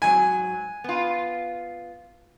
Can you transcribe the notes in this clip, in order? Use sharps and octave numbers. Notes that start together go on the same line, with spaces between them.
G#2 F#3 G#5
B3 F4